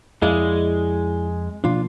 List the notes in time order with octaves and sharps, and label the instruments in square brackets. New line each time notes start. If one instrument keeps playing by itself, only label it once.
[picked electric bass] F2 [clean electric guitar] G#3 [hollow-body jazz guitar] E4 D5 F5
[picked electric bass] B2 F3 A#3 [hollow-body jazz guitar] D4 F4